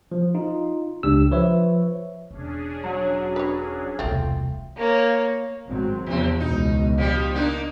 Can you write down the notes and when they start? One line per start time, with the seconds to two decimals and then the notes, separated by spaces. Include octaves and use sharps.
0.12 F3
0.35 D#4 F4
1.03 C#2 D4 G4 E6
1.31 F3 B4 C#5 E5
2.31 E1 C#4 D4 G#4
2.84 F#3
3.36 B4 C#5
3.99 E1 C2 A3 C4 F4
4.77 A#3 C#5
5.67 G#1 F#3 C4
6.06 E2 C3 F3 C4
6.40 C#2 B2 D#4
6.98 F3 G3 G4
7.35 A#3 D4 D#4